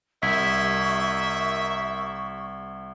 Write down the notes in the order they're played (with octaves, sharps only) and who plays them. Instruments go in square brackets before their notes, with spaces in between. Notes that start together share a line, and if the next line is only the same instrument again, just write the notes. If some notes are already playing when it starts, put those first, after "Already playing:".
[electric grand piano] C2 [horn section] A#4 D#5 E5 [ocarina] C#6 [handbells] G#6 B6